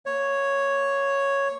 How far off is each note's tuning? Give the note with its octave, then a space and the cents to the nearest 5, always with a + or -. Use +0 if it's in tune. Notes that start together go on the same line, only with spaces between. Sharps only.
A#3 +0 C#5 +0